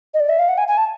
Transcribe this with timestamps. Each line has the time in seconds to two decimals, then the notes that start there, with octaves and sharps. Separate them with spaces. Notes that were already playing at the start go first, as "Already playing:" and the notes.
0.14 D#5
0.20 D5
0.29 E5
0.39 F5
0.49 F#5
0.58 G#5
0.68 G#5
0.78 A5